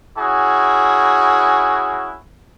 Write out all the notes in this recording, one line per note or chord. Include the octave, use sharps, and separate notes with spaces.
C#4 E4 F#4 G#4